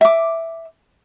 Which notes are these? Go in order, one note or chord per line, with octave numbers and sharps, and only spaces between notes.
E5 D6